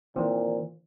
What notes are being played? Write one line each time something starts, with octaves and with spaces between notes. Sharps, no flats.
A#2 D#3 E3 C4